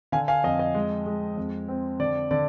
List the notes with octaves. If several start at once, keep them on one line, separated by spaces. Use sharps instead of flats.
D3 F5 G#5
F5 G#5
F2 D#5
D#5
G#3
G#3
F2
C4
D3 D5
D3 D5